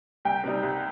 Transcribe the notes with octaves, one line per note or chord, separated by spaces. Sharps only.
C2 G5
C3 G3 D#4
C2